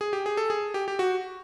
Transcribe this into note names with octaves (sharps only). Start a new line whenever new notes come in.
G#4
G4
G#4
A4
G#4
G4
G4
F#4